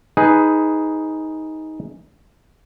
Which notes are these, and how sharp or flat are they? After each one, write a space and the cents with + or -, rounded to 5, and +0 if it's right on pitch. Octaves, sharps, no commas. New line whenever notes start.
D#4 +15 G#4 +0 B4 +5